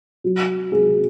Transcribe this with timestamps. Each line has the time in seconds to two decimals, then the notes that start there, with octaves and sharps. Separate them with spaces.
0.24 F#3
0.72 G#4